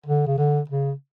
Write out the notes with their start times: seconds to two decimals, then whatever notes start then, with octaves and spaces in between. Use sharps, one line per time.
0.06 D3
0.27 C#3
0.38 D3
0.70 C#3